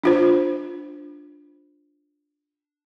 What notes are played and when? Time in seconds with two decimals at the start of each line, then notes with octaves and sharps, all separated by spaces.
0.04 D4 F4 C5